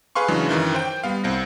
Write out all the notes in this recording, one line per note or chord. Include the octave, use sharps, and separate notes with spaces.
G#4 B4 F5 C6 C#6
C#3 E3 F#3 G#3 D4
F#2 D#3 E3
C5 G5
G3 B3 F5
C2 C4 A#6